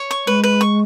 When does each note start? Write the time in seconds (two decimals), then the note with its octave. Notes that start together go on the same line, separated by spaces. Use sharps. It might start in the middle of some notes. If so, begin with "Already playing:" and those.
Already playing: C#5
0.11 C#6
0.27 G#3 B4
0.44 B4
0.61 C#6